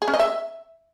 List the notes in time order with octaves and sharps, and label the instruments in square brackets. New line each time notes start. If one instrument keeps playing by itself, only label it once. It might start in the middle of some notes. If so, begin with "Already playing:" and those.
[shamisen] G#4
C#4
D#5
E5